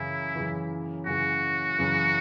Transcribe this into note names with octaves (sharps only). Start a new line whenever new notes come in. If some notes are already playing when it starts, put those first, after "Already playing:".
Already playing: F#2 C#3 E3 E4
F#2 C#3 E3
F#2 C#3 E3 F#4
F#2 C#3 E3